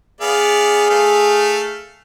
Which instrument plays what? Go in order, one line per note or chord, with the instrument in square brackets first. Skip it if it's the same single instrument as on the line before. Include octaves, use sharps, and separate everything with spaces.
[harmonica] B3 D5 F5 [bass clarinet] G#4
[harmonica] A3 F5